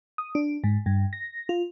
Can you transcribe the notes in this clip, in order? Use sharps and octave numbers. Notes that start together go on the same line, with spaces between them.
D#6
D4
G#2
G2
A#6
F4